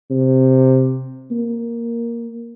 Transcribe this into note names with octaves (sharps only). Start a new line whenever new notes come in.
C3
A#3